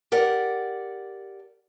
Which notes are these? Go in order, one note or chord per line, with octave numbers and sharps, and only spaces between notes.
G4 A#4 D5 F#5